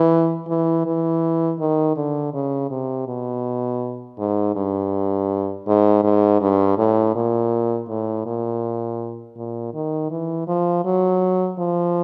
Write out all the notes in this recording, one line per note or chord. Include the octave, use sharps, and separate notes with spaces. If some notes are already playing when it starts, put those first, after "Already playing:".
Already playing: E3
E3
E3
D#3
D3
C#3
C3
B2
G#2
G2
G#2
G#2
G2
A2
A#2
A2
A#2
A#2
D#3
E3
F3
F#3
F3